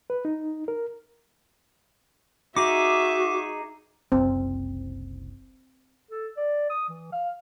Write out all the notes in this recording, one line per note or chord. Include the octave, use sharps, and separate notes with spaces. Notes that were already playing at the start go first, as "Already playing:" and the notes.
B4
D#4
A#4
D#4 F#4 G#4 E5 D6
F#1 C2 C4
A4
D5
D#6
E3
F5